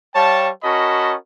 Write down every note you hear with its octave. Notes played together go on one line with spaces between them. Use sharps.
G3 C#5 F5 G5 A5
C#4 F#4 A#4 D#5 A5 B5